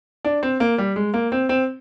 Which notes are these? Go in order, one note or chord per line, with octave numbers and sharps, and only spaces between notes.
D4
C4
A#3
G3
G#3
A#3
C4
C4